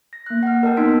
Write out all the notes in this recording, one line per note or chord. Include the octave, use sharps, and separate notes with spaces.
A#6
A#3 F#6
F#5 F6
A#4 D#5 G5 A5 G6
B3 D#4 C6 E6 B6 D7